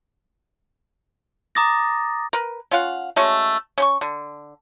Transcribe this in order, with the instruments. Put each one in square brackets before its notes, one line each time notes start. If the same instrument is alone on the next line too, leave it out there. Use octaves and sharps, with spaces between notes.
[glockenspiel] A#5 D6 D#6 A6 A#6
[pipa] A#4 B4
C#4 F4 F5 F#5
G#3 A3 C#4 F#4
C#4 C5 C#6
D3